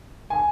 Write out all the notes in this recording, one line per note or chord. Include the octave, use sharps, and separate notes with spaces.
G#5